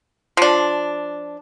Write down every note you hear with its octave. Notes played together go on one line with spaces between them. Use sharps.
F3 D4